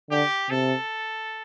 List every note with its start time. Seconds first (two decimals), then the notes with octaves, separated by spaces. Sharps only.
0.10 D3 G4
0.50 C3 A4